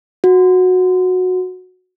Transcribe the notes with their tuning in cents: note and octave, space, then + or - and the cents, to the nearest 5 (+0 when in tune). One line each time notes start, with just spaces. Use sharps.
F#4 -10